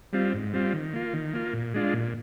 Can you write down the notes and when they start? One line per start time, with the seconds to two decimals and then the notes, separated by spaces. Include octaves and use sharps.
0.13 G3 C4 F4
0.34 G#2
0.53 G3 C4 F4
0.74 D#3
0.93 A#3 F4
1.13 D#3
1.34 A#3 F4
1.53 A#2
1.74 G#3 D4 F4
1.94 A#2